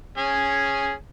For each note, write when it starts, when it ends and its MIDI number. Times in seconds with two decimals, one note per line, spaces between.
0.18 0.92 61
0.18 0.92 68
0.18 0.92 80